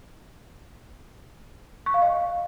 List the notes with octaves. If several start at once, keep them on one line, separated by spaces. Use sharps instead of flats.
C#6
F5
D#5